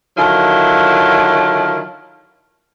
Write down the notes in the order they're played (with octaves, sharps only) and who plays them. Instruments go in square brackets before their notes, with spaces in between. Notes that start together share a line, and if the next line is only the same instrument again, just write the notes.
[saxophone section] D3 D#3 F#3 E4 F4